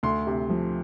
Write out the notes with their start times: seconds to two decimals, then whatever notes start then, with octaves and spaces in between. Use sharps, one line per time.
0.03 D2 C6
0.27 C3
0.50 F3